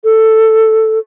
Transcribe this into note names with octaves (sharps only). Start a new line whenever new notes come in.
A4